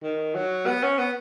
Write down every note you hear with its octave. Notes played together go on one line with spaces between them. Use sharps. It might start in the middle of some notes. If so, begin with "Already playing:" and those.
D#3
F#3
B3
C#4
B3